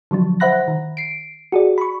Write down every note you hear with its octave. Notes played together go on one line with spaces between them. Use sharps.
D3 F3 F#3 D4
C5 E5 F#5 B5 F#6 A#6
D#3
C7 D7
F#4 G#4 D5
B5 C#6